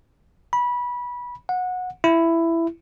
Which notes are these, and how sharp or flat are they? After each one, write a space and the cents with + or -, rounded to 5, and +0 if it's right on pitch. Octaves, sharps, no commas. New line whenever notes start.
B5 -20
F#5 -20
E4 +10